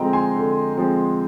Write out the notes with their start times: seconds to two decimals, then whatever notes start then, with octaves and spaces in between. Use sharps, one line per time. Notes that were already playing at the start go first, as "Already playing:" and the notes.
Already playing: D3 F3 G#3 C4 D#5 G5 A#5
0.13 G#5 C6
0.35 D3
0.77 F3 G#3 C4